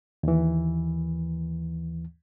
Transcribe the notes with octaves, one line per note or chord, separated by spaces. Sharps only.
D#2 E3